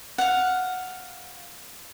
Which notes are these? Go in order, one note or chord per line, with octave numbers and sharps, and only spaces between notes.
F5 F#5